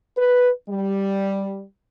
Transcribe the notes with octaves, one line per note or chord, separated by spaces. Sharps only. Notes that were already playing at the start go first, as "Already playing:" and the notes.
B4
G3